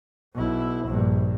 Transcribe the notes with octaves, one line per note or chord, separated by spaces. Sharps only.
B1 E4
A#1 G2